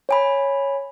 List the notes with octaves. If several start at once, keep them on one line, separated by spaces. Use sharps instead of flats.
C#5 G#5 B5